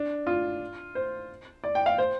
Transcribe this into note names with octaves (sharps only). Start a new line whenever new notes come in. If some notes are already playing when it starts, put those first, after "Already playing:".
Already playing: D4
F4
C5
D5
G5
F5
C5